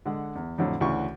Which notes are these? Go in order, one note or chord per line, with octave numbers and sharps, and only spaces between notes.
D3 G#3 F#5
E2
F2 A2 D3 F#3
D2 C#3 E3 F#4 C#6